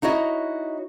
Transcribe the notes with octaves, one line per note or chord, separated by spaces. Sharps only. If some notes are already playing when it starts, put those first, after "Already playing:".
D#4 E4 F#4 C#5 D#5